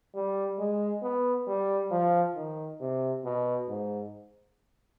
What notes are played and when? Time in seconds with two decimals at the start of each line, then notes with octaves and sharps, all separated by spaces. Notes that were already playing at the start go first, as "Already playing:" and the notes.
0.15 G3
0.59 G#3
1.03 B3
1.47 G3
1.91 F3
2.36 D#3
2.80 C3
3.25 B2
3.68 G#2